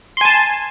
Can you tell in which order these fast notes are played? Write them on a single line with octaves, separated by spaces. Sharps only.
C6 G#5 A5